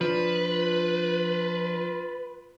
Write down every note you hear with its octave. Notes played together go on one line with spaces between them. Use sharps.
F3 D4 F4 B4